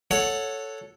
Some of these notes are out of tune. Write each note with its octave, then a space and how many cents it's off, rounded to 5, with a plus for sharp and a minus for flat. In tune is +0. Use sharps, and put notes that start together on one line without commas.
A4 +0 C#5 +0 F#5 -15